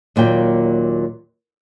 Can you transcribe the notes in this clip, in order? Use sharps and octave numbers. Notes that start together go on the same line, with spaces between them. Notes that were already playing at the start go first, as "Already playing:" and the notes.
D#2 A#2 F#3 G5